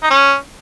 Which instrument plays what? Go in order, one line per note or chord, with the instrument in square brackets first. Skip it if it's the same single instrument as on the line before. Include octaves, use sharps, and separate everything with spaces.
[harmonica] D#4
C#4